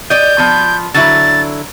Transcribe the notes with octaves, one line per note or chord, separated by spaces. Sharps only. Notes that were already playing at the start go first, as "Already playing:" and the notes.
D5 D#5 G6
F3 B3
D3 F#3 E4 A6